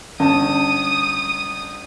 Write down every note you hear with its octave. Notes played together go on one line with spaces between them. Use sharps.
G1 C#4 A5 D#6